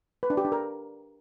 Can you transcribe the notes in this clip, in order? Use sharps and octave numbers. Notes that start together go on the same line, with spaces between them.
B4
D4
G4
D4
A#4